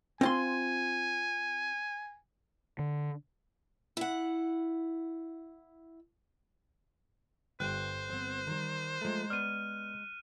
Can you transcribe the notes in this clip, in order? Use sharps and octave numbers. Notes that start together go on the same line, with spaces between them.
C4 F4 G#5 C6
D3
E4 F#5
G1 G2 C5 G5 F#6
B3 C4
D#3 G3
F3 G#3 A3 A#5
B3 D5 F6 D#7